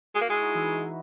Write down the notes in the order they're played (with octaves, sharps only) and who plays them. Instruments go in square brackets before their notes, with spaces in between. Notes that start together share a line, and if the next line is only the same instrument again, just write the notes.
[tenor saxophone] G#3 [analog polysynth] F#4
[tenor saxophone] A#3
[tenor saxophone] G#3 [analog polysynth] E4
[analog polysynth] D#4
E3 E4